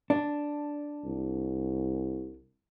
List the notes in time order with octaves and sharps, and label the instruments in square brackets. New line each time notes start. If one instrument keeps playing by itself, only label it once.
[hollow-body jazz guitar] D4
[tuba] C2